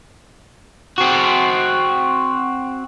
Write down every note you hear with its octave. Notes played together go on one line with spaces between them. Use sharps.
C4 F#4